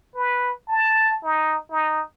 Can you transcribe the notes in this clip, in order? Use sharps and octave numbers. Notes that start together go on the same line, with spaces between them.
B4
A5
D#4
D#4